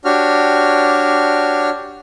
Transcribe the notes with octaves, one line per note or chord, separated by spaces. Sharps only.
D4 F#4 G4 C#5 F6